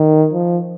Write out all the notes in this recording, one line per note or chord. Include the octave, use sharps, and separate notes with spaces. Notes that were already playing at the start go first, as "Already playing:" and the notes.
Already playing: D#3
F3